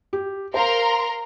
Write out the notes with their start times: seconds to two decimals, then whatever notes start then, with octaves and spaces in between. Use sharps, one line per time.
0.13 G4
0.54 A#4 C5 F5 A#5 C6